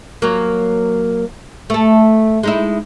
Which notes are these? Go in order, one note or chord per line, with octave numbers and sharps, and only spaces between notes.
F#3 A#3
A3 A4
G#3 D#4 E4